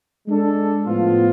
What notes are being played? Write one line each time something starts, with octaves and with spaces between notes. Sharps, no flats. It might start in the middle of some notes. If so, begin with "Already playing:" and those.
G#3 D4 A4
A2 F3 B3 F4